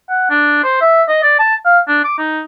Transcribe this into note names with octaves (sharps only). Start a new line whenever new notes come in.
F#5
D4
C5
E5
D#5
D5
A5
F5
D4
D6
D#4